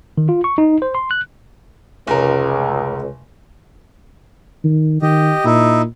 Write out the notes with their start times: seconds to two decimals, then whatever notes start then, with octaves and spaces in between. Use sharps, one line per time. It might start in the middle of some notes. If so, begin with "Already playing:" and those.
0.18 D#3
0.29 F4
0.44 C#6
0.58 D#4
0.82 C5
0.95 C6
1.11 F#6
2.07 F1 C#2 A#4
4.64 D#3
5.02 D#3 G4 D#5
5.45 A#2 D#4 E4